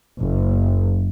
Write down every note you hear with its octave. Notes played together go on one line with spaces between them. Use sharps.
F#1